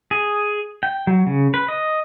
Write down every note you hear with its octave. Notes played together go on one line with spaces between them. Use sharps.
G#4
G5
F#3
C#3
B4
D#5